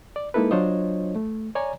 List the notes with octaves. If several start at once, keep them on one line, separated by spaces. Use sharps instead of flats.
D5
G#3 A#3 D#4 E4 A4 B4
F#3 D4 F4 C5 C#5 D#5
A3
C#5 D5 G#5 A#5